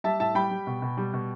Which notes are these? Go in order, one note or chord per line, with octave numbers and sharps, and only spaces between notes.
G3 E5 A5
A2 E5 A5
G3 G5 B5
G3
B2
B2
G3
B2